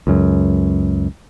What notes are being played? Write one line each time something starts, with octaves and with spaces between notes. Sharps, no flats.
C#2 F#2